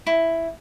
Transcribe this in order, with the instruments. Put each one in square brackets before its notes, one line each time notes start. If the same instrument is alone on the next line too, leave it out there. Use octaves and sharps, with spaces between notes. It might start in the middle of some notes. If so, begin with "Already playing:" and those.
[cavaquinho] E4